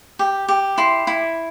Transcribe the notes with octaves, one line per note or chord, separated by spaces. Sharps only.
G4
G4
E4 C6
E4